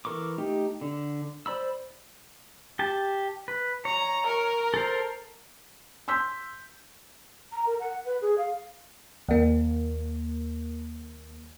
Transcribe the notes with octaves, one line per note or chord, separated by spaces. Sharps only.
E3 A4 A#4 C#6 D6
A3 D#4 G4
D3
C5 D5 B5 E6
G4 A5
B4
C#5 A#5
A#4
A4 C5
C6 E6 G6 B6
A#5
A#4
F#5
B4
G#4
F5
D#2 A#3